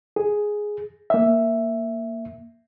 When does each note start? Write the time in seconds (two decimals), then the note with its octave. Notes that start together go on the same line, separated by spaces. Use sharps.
0.16 G#4
1.10 A#3 E5